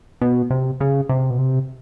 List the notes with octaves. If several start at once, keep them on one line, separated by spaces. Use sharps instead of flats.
B2
C3
C#3
C3
B2
C3